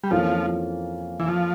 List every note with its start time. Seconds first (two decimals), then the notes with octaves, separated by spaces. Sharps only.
0.03 G3
0.11 F2 E3 F3 A#3 C#4 F4
1.20 E3
1.28 F3